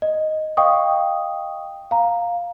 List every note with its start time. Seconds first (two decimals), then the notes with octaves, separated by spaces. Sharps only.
0.02 D#5
0.57 D#5 F5 G5 C#6 D#6
1.91 F5 A#5